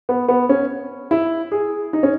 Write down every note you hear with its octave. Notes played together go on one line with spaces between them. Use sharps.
B3
B3
C#4
E4
G#4
D#4
C#4